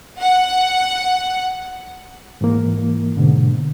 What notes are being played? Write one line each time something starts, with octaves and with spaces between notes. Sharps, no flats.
F#5
G#2 E3 A#3
G#2 B2 D3